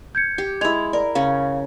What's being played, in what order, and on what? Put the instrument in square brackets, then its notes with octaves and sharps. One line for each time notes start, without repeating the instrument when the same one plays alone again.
[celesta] G6 G#6 C#7
[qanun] G4
[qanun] G#3 E4 [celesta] G#6 F7
[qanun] A#4 [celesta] D5
[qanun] C#3 C#4 [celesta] F5